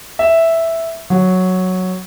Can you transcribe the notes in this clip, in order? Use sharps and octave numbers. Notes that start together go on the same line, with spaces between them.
E5
F#3